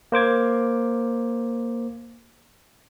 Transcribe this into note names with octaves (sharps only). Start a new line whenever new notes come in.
A#3 C5 D6 G#6